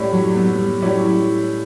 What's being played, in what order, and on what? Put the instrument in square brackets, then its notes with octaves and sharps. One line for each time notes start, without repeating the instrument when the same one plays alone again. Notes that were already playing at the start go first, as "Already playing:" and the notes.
Already playing: [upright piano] A2 G3 C#4 E4
[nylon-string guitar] F#3
B3
G3
[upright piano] A2 G3 C#4 E4 [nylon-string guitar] F#3